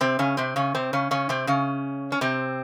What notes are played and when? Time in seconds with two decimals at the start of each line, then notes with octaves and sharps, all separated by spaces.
0.01 C3 C4
0.19 C#3 C#4
0.37 C3 C4
0.56 C#3 C#4
0.75 C3 C4
0.93 C#3 C#4
1.11 C#3 C#4
1.29 C3 C4
1.47 C#3 C#4
2.12 C#4
2.21 C3 C4